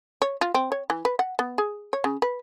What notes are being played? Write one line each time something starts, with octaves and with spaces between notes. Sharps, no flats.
C#5
F4
C4
C#5
E3
B4
F#5
B3
G#4
C#5
C#3
B4